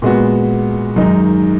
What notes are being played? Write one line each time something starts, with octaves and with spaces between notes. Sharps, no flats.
A#2 G#3 B3 F#4
F#2 D#3 G#3 D#4